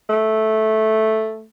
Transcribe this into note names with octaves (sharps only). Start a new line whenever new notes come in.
A3